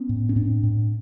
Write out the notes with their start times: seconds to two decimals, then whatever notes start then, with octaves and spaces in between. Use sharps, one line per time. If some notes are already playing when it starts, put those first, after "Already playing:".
Already playing: B3 C#4
0.09 A2
0.29 C#4
0.36 A2 C4 D4
0.63 A2